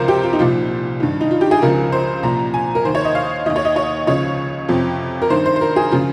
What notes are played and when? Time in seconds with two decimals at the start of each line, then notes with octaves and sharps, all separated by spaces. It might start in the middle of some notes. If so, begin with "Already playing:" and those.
Already playing: C#2 C3 F3 A#4 C5
0.08 G4
0.23 F4
0.33 D#4
0.39 C2 A#2 F3 F4
1.00 G2 D#3
1.21 D#4
1.31 F4
1.41 G4
1.51 G#4
1.62 C#2 C#3 F3 A#4
1.92 C5
2.23 C2 A#2 F3 A#5
2.54 G#5
2.75 A#4
2.84 D#2 D#3 C5
2.95 C#5
3.05 D#5
3.15 F5
3.46 D#2 D#3 D#5
3.56 C#5
3.65 D#5
3.76 C#5
4.07 C#2 C#3 F3 C#5
4.68 F2 C3 F3
5.22 A#4
5.30 G2 D#3 C5
5.46 C5
5.56 C5
5.61 A#4
5.76 G#4
5.92 C#3 F3 F4